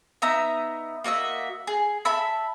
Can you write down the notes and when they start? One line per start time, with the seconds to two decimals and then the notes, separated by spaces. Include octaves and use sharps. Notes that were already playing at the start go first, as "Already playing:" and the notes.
0.22 B3 D#4 E5 A#5
1.04 A#3 F#4 D#5 E5
1.67 G#4
2.05 E5 A5 B5 E6